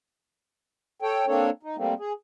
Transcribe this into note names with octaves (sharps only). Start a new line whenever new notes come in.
A4 C#5 G5
A#3 C4 D4 A4 C#5
D#4
G3 A3 A#3 C4
G#4